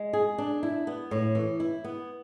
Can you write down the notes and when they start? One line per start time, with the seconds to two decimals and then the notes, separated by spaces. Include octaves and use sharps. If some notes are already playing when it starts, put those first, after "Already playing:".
Already playing: G#3
0.13 G#4
0.38 D4
0.63 E4
0.87 B3
1.11 A2
1.35 E3
1.60 E4
1.84 B3